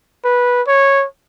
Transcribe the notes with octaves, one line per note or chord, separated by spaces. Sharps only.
B4
C#5